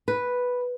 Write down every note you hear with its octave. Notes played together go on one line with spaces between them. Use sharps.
B4